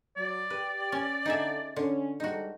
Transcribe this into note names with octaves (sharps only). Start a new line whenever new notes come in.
F#3 D5
G4 B4
C#4
D3 D#4 G#4 E5
D3 C#4
G#2 G3 D#4 F#4 A4